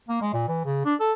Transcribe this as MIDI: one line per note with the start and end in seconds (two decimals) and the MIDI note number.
0.09 0.21 58
0.21 0.30 56
0.33 0.45 46
0.48 0.64 52
0.65 0.82 49
0.85 0.94 62
1.00 1.13 69